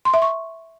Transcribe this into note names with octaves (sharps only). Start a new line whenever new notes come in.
C6
E5
C#6